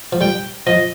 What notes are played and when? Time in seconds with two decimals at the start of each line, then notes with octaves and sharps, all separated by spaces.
0.13 F3
0.21 G3 G5
0.67 F3 D#5